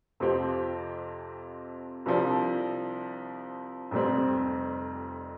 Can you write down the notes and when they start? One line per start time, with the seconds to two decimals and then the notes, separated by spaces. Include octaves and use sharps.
0.20 F2 C3 F3 C4 G4
2.06 C2 C3 F3 D4
3.91 F1 F2 C3 G3 C4